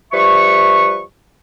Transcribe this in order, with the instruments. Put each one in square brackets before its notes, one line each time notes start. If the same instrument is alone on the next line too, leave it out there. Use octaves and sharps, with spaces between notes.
[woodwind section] F3 G3 B4 E5 C#6